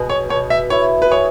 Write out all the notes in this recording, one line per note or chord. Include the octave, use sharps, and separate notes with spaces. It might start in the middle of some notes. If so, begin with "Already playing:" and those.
Already playing: B2 G#4
C#5
B2 C#5
E5
E4 C#5
B4
G#4 C#5